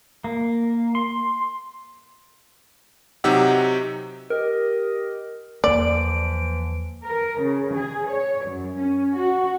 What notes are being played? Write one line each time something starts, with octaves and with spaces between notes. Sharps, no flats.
A#3
C6
C3 F#3 D#4 G4 F#5 E6
G4 A#4 D#5
E2 D3 E3 F3 A#3 D5 D7
A#4
C#3
G#4
C#5
F#2
C#4
F#4